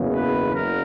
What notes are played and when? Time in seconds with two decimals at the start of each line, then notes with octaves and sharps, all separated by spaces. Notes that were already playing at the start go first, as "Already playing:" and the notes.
Already playing: F#1 E2 C#3
0.14 B4
0.54 F#1 A#4